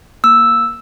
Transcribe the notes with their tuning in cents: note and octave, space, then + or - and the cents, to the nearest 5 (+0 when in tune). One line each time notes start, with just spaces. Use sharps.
A#3 +10 E6 +0